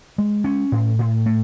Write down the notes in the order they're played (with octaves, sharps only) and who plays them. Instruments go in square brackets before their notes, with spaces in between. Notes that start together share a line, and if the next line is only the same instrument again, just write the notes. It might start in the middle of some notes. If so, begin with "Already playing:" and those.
[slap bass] G#3
C#4
A2
A2
A3